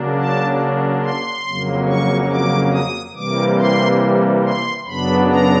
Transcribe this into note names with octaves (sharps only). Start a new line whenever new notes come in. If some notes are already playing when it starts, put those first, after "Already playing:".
Already playing: C#3 F#3 A#3 D4
A5
C6
F2 C#3 F#3 A#3
C#6
D6
D#6
C3 E3 G3 A#3 D6
C6
C6
F#2 C#3 F#3 B3 D4 B5
A#5